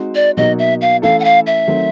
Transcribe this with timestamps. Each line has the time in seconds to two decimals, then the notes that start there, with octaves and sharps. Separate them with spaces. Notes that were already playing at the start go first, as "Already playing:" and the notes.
Already playing: G#3 C4 D#4 F#4
0.15 D5
0.37 B2 F#3 A#3 D#4 F#4 D#5
0.59 E5
0.81 F5
1.02 E3 A3 C#4 E4 A4 F5
1.20 F#5
1.24 F5
1.47 E5
1.68 D#3 F#3 A3 C4